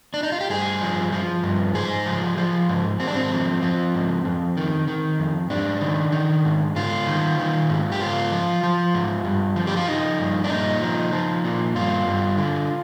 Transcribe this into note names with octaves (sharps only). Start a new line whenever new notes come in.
D4
D#4
F4
G4
G2 G#4
F3
F3
G2
G#2 G#4
F3
F3
G#2
G#2 C4
D4
C4
F3
F3
G#2
F2
D#3
D#3
F2
G#2 D4
D#3
D#3
G#2
G#2 F4
D#3
D#3
G#2
G4
G#2 F4
F3
F3
G#2
G2
F3
G4
F4
F3 D#4
G2
D4
A#2 D#4
F3
F3
A#2
G2 F4
G2
D3